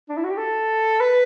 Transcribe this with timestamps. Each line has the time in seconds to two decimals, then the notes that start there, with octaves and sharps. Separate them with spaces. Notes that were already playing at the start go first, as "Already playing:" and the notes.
0.09 D4
0.17 E4
0.24 F#4
0.30 G4
0.37 A4
1.00 B4